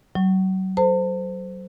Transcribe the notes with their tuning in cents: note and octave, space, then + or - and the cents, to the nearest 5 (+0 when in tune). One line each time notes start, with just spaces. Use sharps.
F#3 +35 C#6 +0
A4 +0 C5 -20 A5 +45